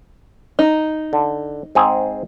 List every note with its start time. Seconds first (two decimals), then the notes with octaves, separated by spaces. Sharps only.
0.59 D#4
1.13 D3
1.75 G#2 C4 G#4